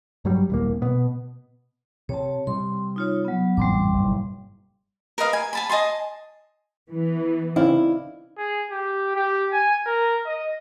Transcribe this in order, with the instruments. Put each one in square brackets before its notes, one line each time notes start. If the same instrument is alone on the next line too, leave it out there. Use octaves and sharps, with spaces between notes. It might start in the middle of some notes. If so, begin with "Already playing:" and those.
[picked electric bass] G2 F#3 G3
D#1 C2 A#3
B2 B3
[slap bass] C3 [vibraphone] C#5 A5
[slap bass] C3 G3 [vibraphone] C6
[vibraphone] D#4 F4 C#5
F#3 B3
[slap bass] A1 F2 G#2 [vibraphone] G3 C6 D6
[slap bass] F#1 G#2 B2
[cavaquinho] A#4 B4 D#5 F5
G#5
G#5 A5 B5
D#5 G#5 A5 C6
[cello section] E3 B3
[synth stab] C#3 C4 [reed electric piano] D#4 D5 F5 [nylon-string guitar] E4
[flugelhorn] G#4
G4
G4
G#5
A#4
D#5